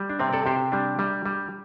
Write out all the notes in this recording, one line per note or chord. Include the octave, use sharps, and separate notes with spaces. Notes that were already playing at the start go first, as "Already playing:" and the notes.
Already playing: G3
D4
C3 C4
A4 D5
C3 G4 C5
G3 D4
G3
G3